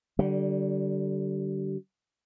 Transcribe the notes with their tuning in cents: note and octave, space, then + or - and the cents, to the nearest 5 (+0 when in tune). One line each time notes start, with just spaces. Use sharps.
D3 +0 G3 -35